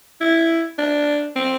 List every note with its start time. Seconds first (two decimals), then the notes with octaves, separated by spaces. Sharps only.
0.21 E4
0.78 D4
1.36 C4